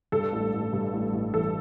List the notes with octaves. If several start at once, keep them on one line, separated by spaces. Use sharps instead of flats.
G2 A4
A1
A1
G2
A1
A1
E3 A4